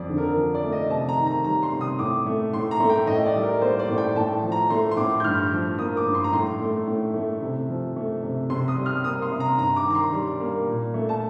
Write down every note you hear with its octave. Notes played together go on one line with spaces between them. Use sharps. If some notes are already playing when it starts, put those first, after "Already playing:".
Already playing: F2 D5
D3
A#4
F3
D5
A3
D#5
C3 A5
A#5
D#3
A#5
G3 A#5
C6
C3
D#6
A2 D6
A3
A2 C6
A#5
A3
G5
A2 D#5
D5
G3
A#4
A#3 C5
D5
A2
G5
A2 A5
F3
A#5
A3 C6
C6
A2 D6
G6
G2 F6
F3
A#3 D#6
D6
G2
C6
A#5
A2 C6
A3
A2
A3
C3
F3
A3
C3
C3 C6
D#6
G3
F6
A#3 D#6
C6
C3
A#5
G2 A#5
D6
D#3 A#5
C6
G3
A#3
A#2
A3
A5